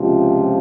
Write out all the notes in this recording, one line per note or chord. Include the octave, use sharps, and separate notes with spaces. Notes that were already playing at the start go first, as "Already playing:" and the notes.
Already playing: C#2 C3 F3